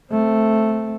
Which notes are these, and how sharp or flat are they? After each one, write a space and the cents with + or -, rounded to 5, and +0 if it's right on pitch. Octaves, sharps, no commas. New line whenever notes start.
A3 +0 C4 +0